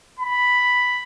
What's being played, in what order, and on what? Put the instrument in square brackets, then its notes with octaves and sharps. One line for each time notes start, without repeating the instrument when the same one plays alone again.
[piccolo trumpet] B5